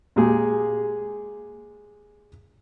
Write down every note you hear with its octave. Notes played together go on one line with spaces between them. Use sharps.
A#2 G#3 G4 G#4